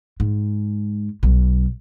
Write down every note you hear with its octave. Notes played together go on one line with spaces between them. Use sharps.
G#2
B1